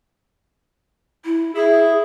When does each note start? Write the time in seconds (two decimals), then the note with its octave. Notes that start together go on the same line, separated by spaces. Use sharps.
1.25 E4
1.55 E4 G#4